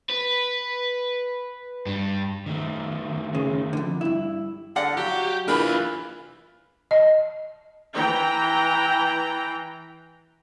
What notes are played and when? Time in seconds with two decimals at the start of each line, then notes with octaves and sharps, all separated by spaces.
0.10 B4
1.86 G2
2.46 D#3 A3
3.35 C#3
3.73 F2 D3
4.01 G2 E4
4.76 D3 D5 F5 F#5
4.97 F#3 G4
5.48 E3 D4 F4 A#4 B5
6.91 D#5
7.95 E3 G5 A#5